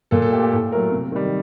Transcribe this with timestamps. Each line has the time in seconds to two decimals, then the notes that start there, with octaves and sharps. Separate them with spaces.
0.11 A#2 A4
0.22 A4
0.32 A3 G4
0.42 G4
0.52 A2 A4
0.72 F#3 A3 A#4
0.92 C3
1.12 D#3 G3